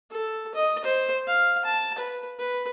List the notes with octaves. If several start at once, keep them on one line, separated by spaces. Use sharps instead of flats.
A4
D#5
C5
F5
A5
B4
B4